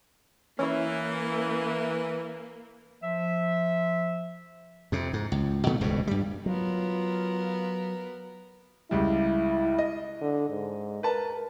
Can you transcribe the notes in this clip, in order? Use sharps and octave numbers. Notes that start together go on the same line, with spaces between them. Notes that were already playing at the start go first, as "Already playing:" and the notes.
E3 A#3 C#4 E4
F3 E5
F2 C3
G#2
C#2
B2 D#3 A3
D#1 C#2 G2 B2
G2 G3
F#3 B3 F4 A#4
C#2 G3 E4
D#5
D3
G#2
A#4 B4 A5